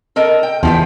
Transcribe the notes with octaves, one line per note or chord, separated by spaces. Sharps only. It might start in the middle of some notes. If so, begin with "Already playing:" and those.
A4 A#4 D#5
G5
E2 F3 G4 B4